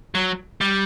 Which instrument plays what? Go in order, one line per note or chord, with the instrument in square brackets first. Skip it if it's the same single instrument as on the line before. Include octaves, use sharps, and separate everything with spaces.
[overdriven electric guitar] F#3
G3